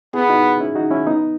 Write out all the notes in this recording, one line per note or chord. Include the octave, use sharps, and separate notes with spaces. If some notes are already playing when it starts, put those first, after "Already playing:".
B3 E4 G#4
D#4 F#4
C#4 E4
D#4 F#4
C#4 E4
B3 D#4